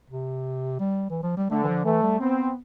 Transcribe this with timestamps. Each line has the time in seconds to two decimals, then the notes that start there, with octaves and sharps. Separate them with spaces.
0.10 C3
0.80 G3
1.10 E3
1.23 F3
1.37 G3
1.50 D3 A3
1.63 E3
1.68 F3
1.84 E3 A3
2.03 G3
2.20 B3 C4